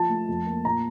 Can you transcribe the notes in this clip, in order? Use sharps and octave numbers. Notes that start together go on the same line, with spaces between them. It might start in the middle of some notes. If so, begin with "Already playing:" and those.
Already playing: F3 A5
A3
F2
A#3
A#2 A#5